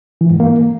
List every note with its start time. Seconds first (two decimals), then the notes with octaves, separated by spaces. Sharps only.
0.21 E3
0.30 G#2
0.40 A#3